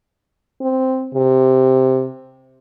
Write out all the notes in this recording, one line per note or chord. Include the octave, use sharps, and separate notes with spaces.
C4
C3